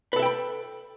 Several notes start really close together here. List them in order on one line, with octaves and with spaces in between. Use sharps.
B4 A4 E5 G5 B5